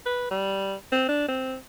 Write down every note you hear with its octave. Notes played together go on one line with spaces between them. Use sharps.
B4
G3
C4
D4
C4